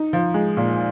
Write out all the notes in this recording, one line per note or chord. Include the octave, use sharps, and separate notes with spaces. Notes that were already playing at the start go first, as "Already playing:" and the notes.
Already playing: D#4
F3
G#3
A#2